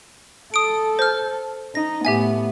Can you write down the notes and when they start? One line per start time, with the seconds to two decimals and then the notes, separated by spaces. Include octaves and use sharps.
0.54 A4 D#6 D7
0.99 C5 F6
1.75 D#4 A#6
2.05 A2 B3 G4 E5 G#5